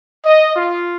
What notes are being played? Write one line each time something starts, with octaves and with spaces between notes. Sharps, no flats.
D#5
F4